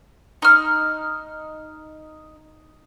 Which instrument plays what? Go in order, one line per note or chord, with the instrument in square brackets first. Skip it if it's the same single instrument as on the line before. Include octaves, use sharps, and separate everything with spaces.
[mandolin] D#4 F6